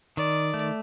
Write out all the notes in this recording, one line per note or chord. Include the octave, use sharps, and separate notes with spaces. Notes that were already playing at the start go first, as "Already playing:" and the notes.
D#3 D5
A3